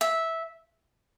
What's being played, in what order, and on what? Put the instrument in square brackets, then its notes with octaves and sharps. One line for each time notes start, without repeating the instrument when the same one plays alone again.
[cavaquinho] E5